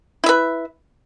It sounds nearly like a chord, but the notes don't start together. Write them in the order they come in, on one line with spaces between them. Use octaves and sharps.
E4 E5 B4